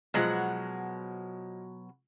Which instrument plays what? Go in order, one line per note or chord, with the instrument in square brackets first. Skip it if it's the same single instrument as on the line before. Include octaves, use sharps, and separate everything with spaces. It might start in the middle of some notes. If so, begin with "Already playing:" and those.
[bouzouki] B2 F#3 F#5 [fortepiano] F3 G#3